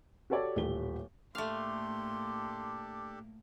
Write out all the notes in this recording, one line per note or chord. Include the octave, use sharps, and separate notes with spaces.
F#4 G4 A4 C#5 D5
D#1 A1 A3 G4 G7
A2 A3 A#3 D4 G4 A4 F5 C6